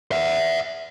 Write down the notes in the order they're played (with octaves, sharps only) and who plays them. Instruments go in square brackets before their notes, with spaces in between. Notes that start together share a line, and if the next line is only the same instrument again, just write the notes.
[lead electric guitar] E5 F#5